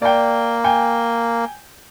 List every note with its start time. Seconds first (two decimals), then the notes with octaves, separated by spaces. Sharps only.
0.02 A#3 D5 G5
0.64 G5 G#5